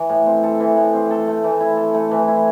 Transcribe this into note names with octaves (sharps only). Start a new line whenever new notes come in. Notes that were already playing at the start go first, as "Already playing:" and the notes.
Already playing: E3
A2
C4
A4
E3
A2
C4
A4
A3
E3
E4
A4
A3
E3
E4